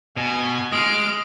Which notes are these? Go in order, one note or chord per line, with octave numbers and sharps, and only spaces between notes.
B2 G#5
G#3 D#6 F6 D7